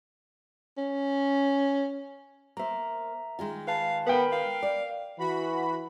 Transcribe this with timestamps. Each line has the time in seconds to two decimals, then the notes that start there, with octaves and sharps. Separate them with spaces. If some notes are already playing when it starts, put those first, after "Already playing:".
0.78 C#4
2.57 A#3 C5 E5 A#5
3.39 D#3 G#3 F4
3.67 B4 F5 A5
4.07 B3 A#4 B4 G5 B5
4.32 F5
4.63 D5
5.18 E3 F#4 B5